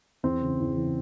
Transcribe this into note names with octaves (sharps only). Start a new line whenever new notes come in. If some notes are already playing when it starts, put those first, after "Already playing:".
E2 C4
C#3 E3
E2
C#3 E3